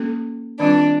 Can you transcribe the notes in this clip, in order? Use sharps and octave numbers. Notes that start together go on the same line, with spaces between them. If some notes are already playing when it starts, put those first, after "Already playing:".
Already playing: A#3 C#4 F#4 A4
D#3 G3 C4 D4 F4